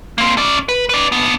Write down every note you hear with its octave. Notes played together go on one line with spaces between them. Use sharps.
A#3 C4
C#4 D5
B4
B4 D5
B3 D4